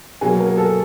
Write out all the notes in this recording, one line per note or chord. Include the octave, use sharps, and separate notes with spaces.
B2 F#3 A#3 G#4
A#4
A4